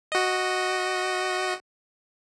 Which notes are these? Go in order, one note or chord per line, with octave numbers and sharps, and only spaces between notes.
F#4 D#5